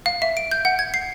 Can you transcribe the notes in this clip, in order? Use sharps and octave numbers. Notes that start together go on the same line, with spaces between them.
F5
E5
D7
G6
F#5
G#6
C7